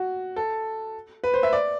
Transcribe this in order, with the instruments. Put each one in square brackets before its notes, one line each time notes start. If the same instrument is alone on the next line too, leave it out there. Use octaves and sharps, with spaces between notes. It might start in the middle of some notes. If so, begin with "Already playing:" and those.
Already playing: [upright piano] F#4
A4
B4
C5
E5
D5